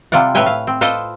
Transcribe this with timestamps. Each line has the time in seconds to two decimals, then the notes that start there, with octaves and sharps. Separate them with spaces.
0.12 C3 G3 F4 D5 F#5
0.35 A2 B4 C#5 E5 G5 G#5
0.46 F5
0.67 C4
0.81 F4 A4 B4 C5 D5 D#5